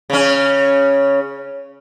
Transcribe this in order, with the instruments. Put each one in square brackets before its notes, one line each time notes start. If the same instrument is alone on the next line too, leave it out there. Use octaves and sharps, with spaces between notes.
[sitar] C#3 C#4